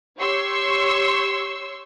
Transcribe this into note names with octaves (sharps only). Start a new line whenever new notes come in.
G4 C#5 C6 C#6 E6